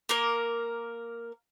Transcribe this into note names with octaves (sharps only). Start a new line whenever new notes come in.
A#3 A#4